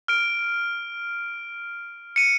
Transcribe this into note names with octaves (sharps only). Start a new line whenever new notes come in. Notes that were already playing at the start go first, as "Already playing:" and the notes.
F6 D7
C#7 D#7